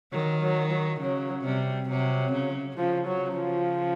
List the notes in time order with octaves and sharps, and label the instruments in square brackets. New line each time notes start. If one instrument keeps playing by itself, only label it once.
[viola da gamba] D#3 [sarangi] F#3
[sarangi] F#3
F#3
[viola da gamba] C#3 [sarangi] F#3
[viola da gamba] C3 [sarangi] G3
[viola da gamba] C3 [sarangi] F#3
[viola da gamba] C#3
[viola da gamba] C#3 [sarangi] F3
[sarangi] F#3
[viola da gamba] C#3
[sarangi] F3